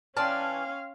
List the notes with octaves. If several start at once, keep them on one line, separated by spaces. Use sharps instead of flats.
E3 C#4 D5 F5 G5 A5 C6 F6